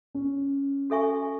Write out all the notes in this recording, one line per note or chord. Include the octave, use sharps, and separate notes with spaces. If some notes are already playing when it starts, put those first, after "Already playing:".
C#4
F#4 A4 E5 G#5 C#6